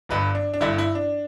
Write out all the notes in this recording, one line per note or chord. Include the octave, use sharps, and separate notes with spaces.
G1 G2 D3 B4
D4
D4
G1 G2 D3 E4
E4
D4